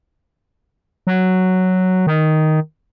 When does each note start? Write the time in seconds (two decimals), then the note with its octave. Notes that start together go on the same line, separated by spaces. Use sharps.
1.07 F#3
2.07 D#3